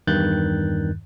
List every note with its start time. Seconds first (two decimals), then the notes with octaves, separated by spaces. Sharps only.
0.07 E2 G2 D#3 F#6 G6 A6